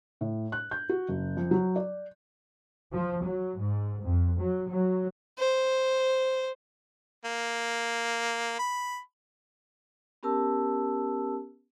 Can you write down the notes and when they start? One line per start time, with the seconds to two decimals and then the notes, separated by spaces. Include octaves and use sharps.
0.21 A2
0.52 F#6
0.71 G6
0.89 F#4
1.09 F#1
1.37 F2
1.51 F#3
1.76 D5
2.92 F3
3.24 F#3
3.59 G#2
4.04 F2
4.39 F#3
4.70 F#3
5.39 C5
7.25 A#3
8.59 B5
10.23 B3 C#4 G4 A#4 A5 E6